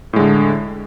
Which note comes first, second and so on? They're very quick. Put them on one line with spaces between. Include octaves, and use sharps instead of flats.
A2 G#3 D3